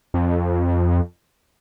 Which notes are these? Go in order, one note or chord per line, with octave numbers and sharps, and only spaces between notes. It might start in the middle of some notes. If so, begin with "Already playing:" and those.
F2